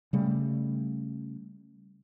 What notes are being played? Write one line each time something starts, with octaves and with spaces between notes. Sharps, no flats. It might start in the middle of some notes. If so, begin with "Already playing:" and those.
C#3 G3 A3